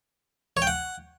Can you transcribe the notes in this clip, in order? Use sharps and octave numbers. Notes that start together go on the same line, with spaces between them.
C#5
G5
F#5